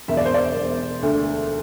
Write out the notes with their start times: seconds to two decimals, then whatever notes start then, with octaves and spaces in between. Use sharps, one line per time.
0.08 E1 E5
0.17 D5
0.25 C5
0.34 D5
0.56 E1
1.03 D2